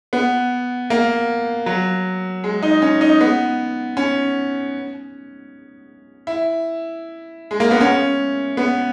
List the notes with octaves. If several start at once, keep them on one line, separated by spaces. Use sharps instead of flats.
B3
A#3
F#3
G#3
D#4
C#4
D#4
B3
C#4
E4
G#3
A#3
B3
C#4
B3